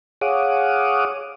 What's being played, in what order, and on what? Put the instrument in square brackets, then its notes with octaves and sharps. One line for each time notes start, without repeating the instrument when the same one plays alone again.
[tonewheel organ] G#4 C#5 F5 F#5 D6 D#6